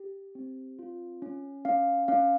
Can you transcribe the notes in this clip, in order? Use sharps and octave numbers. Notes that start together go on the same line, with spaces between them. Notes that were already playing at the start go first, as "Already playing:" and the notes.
Already playing: G4
C4
F4
C#4
C#4 F5
C#4 F5